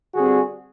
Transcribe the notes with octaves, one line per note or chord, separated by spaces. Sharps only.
D3 G3 C4 F#4 G#4